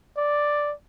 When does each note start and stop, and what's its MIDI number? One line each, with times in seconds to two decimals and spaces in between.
0.17 0.73 74